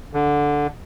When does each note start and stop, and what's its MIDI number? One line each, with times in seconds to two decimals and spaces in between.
0.14 0.67 50